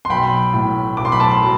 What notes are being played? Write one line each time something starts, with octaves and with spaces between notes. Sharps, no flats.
C6
B1 G5 B5
A2
B1 D6
C6
B5
A5 C6
F#3